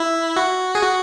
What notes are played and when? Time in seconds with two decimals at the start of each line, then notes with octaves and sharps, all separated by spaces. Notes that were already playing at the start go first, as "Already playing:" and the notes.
Already playing: E4
0.36 F#4
0.75 G#4
0.83 F#4